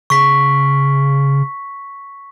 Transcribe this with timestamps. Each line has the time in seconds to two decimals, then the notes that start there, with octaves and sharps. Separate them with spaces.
0.10 C#3 C#6 B6